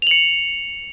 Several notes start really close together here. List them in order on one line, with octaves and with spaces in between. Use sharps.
F7 F#7 C#7